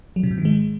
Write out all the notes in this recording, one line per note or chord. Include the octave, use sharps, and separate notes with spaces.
F#3
C3
G#2
D#3
G#3